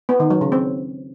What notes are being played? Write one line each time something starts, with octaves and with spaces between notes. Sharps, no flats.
B3
D#3
F#3
C#3
C4